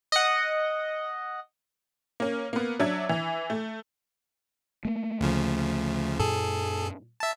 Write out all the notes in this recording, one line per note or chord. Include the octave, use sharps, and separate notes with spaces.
D#5 F#5
A#3 C#4
A#3 B3
F#3 D4 E5 G#6
E3
A3
A3 A#3
D2 C#3 F3
F#2 A#2 G#4 A4
E5 A5